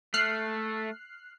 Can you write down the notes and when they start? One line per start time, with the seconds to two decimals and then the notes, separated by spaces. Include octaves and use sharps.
0.14 A3 F6 F#6 C7